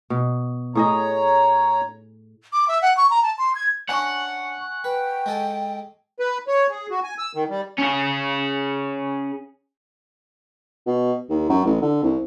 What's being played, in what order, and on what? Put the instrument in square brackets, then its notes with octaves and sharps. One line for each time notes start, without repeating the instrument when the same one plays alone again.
[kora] B2
[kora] A2 G#4 D#5 [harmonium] C#5 A#5
[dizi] D6
E5
F#5
C#6
A#5
A5
C6
G#6
[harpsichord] C#4 D4 [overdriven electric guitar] F#5 [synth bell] G#5 C#6
[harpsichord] B4 [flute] G5
[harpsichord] G#3 A4 G#5
[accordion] B4
C#5
G#4
F#4
G#5
E6
D#3
G3
[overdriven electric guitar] C#4 G#4
[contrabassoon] B2
D#2
F#2
A1
D3
C2